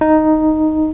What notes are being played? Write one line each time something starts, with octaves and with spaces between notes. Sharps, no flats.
D#4